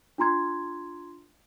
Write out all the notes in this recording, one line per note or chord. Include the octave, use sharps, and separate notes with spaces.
D4 F4 A#5 C6 G#6